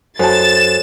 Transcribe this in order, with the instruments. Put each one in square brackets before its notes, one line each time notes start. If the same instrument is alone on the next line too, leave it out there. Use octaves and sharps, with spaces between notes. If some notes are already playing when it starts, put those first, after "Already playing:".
[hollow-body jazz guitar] F#2 A5 [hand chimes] A4 C5 C#5 [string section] A6 [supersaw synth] E7